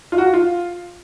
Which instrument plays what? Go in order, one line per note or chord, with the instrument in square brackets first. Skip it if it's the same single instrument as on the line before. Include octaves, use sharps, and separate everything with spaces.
[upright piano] F4
F#4
F4